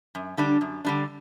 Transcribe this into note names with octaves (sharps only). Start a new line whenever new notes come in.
F#2
D3 G3 D4
F#2
D3 G3 D4